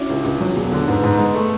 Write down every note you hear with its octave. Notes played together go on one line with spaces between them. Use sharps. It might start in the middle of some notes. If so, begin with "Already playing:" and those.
Already playing: C#4 D4 E4 F#4
C#2
C#2
F#3
E1
D3
G#2 B3
G#2
G#3
A3